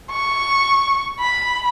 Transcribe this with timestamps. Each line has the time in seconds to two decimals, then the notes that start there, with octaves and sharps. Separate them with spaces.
0.10 C#6
1.20 B5